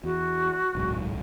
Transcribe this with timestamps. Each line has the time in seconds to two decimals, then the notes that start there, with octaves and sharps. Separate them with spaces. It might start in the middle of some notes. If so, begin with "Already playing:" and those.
0.04 E2 F#4
0.75 D1 B1 G#2